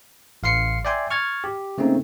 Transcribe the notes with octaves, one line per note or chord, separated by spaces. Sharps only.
A1 F5 C6 C7 C#7
D5 E5 G5 G#5 C6
C#6 F6 G#6 A6
G4
C#3 A3 A#3 C4 D#4